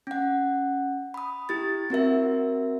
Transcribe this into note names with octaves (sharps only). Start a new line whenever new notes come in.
C#4 F#5
B5 D#6
E4 G4 A6
C4 F#4 A#4 E5